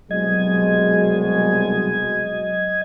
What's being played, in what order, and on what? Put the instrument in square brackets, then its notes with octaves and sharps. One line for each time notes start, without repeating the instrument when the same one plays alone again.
[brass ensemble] C2 B2 G#3 [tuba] F#3 [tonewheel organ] D#5 G#6